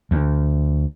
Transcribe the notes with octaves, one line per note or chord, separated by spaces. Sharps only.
D2